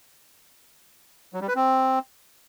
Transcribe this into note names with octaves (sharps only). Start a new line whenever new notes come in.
F#3
G3
B4
C4